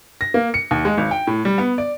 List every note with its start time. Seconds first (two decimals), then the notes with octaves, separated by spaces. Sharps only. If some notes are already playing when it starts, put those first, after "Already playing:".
0.21 A#6
0.34 A#3
0.54 C#7
0.71 D#2
0.85 G#3
0.98 G#1
1.11 G5
1.27 A2
1.45 G3
1.58 B3
1.78 D5